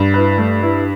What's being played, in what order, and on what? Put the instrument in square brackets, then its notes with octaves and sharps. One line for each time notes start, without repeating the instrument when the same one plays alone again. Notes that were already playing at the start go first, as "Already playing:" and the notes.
Already playing: [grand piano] G2
[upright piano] E4 B4
A3
E4 B4